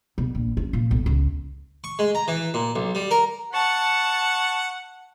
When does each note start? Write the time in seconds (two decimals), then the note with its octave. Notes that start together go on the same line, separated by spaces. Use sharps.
0.18 B2
0.35 A#1
0.57 C#4
0.73 A#2
0.91 B1
1.06 C#2
1.84 C#6
1.99 G#3
2.15 A#5
2.28 E3
2.54 A#2
2.76 B1
2.95 G3
3.11 A#4
3.53 F#5 A5 C#6